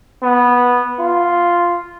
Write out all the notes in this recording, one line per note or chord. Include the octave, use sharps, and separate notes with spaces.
B3
F4